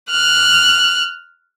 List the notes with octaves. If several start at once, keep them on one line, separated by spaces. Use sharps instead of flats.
F6 F#6